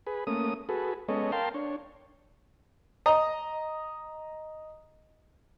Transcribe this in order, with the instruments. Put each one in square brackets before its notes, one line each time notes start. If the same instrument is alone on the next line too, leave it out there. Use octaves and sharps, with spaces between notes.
[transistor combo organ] G#4 B4
A3 A#3 C#4 D#6
F#4 G#4 A4 B4
G#3 B3 C#4 A4 C#5 D#5
A#4 F5 G5 A5 C6
D4 C#5
[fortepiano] D#5 A#5